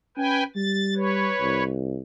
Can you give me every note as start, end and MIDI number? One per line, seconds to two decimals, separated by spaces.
0.17 0.43 61
0.17 0.44 71
0.17 0.44 79
0.17 0.44 80
0.56 1.31 55
0.56 0.94 93
0.96 1.64 71
0.96 1.64 73
1.41 2.01 36